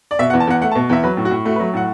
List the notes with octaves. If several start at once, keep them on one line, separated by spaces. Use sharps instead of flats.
D5
B2 E5
F#5
E2
A5
E2 F#5
A3 F#5
A5
B2
E2 E5
F#3 B4
A2
F#4
A2
A3 F#4
B4
F#3
A2 F#5